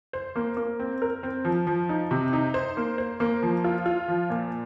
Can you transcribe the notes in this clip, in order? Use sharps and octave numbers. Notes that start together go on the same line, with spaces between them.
C5
A#3
A#3
C4
A#4
C4
F3
F3
D#4
C3
D#4
C5
A#3
C5
A#3
F3
F4
F4
F3
A#2